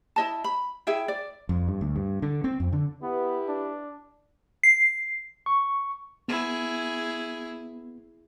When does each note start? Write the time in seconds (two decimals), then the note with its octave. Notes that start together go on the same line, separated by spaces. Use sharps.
0.16 E4 D#5 A5
0.44 B5
0.87 E4 G#4 E5 G5
1.08 D5
1.49 F2
1.68 G2
1.81 D2
1.96 G2
2.22 D3
2.44 C4
2.60 F2
2.73 D3
3.02 B3 E4 G4 B4
3.48 D4
4.63 C7
5.46 C#6
6.28 B3 E4 G#4